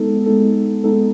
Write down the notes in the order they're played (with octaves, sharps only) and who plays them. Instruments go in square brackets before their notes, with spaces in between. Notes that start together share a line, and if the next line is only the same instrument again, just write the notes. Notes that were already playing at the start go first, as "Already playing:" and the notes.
Already playing: [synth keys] G#3 B3 D#4 A4
G#3 B3 D#4 A4
G#3 B3 D#4 A4